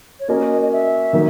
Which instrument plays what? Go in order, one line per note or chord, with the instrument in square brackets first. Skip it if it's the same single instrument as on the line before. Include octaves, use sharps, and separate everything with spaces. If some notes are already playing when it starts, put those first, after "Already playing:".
[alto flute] C#5
[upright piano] A#3 C#4 F#4 A#4 [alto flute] D#5
[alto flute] D#5
E5
[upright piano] D#3 F#3 A#3